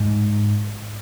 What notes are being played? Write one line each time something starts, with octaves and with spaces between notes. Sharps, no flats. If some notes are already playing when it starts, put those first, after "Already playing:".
Already playing: G#2